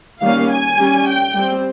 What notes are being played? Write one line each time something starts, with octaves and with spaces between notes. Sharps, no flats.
D#3 G3 A#3 C#4 F5
G#5
G3 C#4
G5
G3 C4